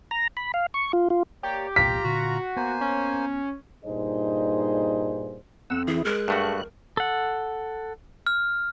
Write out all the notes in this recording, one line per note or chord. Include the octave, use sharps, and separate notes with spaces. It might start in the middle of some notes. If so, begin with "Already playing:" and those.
A#5
B5
F5
C#6
F4
F4
A#3 G4 C#5 D5
E1 C2 A#2 F4 A#5 B6
A#2 D3 F#4
A#3 B3 C5 G#5
C#4
G2 A#2 D#4 G#4 C5 D#5
F2 F#5 E6
E3 E4 G#4
G#3 A#4 F#6
G2 A3 F#4
A4 F#5
F6